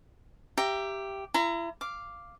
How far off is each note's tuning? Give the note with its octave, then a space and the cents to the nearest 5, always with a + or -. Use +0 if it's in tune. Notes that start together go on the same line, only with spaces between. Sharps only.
G4 +0 E5 +25 A#5 +0
E4 +35 A#5 +0
F5 -5 D6 +0